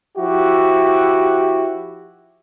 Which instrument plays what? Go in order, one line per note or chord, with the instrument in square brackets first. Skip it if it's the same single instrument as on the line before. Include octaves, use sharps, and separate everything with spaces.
[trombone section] F3 E4 F#4 G4